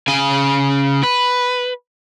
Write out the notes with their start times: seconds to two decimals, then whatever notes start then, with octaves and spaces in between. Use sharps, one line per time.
0.08 C#3 G#5
1.03 B4